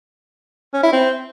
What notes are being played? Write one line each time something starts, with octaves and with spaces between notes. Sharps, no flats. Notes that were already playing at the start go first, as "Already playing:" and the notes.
C#4
E4
C4